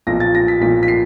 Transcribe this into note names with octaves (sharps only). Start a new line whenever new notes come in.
B1 A#2 F3 A#6
A6
A#6
B6
B1 A#2 F3 B6
B6
C7